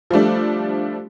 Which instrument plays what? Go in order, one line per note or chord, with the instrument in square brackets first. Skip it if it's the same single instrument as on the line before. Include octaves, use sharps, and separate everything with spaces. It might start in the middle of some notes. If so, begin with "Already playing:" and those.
[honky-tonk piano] F3 G3 A3 D4